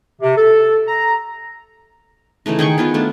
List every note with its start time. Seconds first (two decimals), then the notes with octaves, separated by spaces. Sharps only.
0.22 C3
0.37 A4
0.88 A#5
2.46 C#3 E3 A3 D#4
2.59 D#3 G#4 G5 C#6
2.78 D#3 B3 F4
2.94 A3 D4